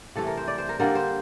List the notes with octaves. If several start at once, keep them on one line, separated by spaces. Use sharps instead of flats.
C3 E3 A3 A4
A#4
C5
D5
C5
A#4
D3 G3 A#3 A#4
C5